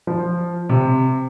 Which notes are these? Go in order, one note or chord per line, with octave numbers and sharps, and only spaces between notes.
F3
C3